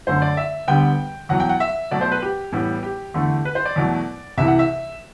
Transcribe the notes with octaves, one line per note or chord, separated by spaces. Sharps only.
F#2 D3 A3 C5
D5
E5
D2 D3 G3 B3 G5
E2 B2 F#3 F#5
G5
F#5
E5
B2 F#3 A3 D5
C5
B4
G4
A2 E3 G3 B3
G4
E2 D3 A3
B4
C5
D5
E2 B2 F#3 A3
C2 C3 E3 E5
F#5
E5